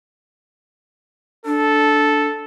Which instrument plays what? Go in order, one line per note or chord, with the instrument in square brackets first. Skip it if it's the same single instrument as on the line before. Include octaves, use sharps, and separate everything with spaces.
[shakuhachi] D4 [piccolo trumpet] A4